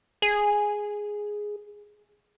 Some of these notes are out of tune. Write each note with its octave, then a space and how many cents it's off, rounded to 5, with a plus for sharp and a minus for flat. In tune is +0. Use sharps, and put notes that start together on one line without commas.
G#4 +0